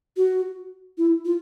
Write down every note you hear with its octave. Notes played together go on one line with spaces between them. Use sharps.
F#4
E4
F4